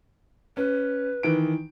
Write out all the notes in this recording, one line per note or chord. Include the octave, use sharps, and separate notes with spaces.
C#4 B4
D#3 E3 D7